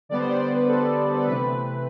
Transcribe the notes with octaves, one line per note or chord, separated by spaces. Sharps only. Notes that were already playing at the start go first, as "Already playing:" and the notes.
D3 G3 B3 D5
C5
D5
C5
B4
A4
A4
C3 E3 A3 C4 B4